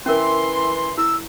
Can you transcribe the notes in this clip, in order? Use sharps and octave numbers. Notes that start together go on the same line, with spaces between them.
E3 C#4 A#4 C6
E4 E6